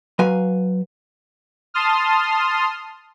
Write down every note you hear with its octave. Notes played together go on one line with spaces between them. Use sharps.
F#3 B4 F5 G#5
A5 C6 D#6 F6